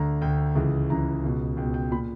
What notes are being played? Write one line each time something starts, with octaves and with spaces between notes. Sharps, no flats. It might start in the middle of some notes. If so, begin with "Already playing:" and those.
Already playing: D2 D3 A#5
D2 D3 G5
C#2 C#3 E3
C#2 C#3 E3 A#5
C#2 B2
C#2 G5
B2
G5
A#2 B5